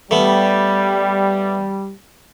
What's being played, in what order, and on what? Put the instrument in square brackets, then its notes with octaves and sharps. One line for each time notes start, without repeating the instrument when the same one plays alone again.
[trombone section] G3 [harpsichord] A3 B3